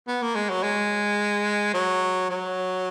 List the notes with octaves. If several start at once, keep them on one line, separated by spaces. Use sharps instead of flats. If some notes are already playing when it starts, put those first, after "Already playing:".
B3
A#3
G#3
F#3
G#3
F#3
F#3